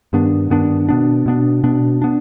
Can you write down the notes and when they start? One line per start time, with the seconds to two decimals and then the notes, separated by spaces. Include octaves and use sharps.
0.13 G2 D#3 B3 D4
0.50 G2 D#3 B3 D4
0.89 B2 B3 D4
1.26 B2 B3 D4
1.63 B2 B3 D4
2.02 B3 D4